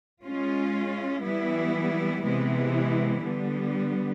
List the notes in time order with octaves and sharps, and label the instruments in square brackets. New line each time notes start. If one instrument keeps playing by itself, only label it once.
[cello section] G#3 C#4 F4
E3 G3 B3 E4
C3 E3 G#3 B3 E4
D3 G3 B3